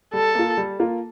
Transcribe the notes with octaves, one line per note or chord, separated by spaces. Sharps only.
G3 A4
A#3 F4
G3
A#3 F4